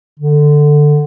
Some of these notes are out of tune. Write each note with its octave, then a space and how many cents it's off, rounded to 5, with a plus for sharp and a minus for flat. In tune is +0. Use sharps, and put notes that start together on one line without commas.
D3 +10